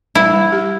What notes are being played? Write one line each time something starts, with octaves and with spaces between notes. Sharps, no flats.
G3 E4
G3
G4